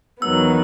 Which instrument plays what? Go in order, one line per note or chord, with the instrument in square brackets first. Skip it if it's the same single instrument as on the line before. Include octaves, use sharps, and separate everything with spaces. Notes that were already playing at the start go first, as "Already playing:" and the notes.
[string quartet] E2 D#3 F#3 B3 [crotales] E6